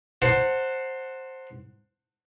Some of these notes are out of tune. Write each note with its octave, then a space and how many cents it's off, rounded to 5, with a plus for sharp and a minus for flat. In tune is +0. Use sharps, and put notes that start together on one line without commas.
C5 +5 F#5 +0 A5 +35